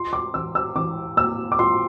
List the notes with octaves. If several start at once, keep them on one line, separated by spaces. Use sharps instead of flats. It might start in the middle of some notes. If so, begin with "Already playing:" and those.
Already playing: F4 C6
D6
E3 E6
E6
E3 D6
A#3 E6
D6
F4 C6